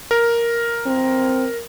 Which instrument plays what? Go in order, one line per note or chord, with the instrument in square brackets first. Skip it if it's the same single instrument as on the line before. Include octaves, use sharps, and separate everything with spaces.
[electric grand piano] A#4
[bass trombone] C4